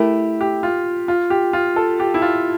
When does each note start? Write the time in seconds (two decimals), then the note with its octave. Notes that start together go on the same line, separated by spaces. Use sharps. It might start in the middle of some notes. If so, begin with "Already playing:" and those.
Already playing: A3 E4 G4 A#4
0.41 G4
0.63 F4
1.08 F4
1.30 G4
1.53 F4
1.76 A4
2.00 G4
2.14 E4
2.22 F4